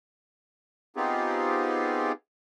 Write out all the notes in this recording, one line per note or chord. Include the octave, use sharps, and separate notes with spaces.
B3 C4 D#4 F4 G4 G#4